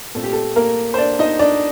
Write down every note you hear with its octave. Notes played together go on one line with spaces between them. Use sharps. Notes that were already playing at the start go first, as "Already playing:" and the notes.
A#2 A3 C4 A4
G4
A4
A#3 A#4
C5
D4 D5
D#4 D#5
D4 D5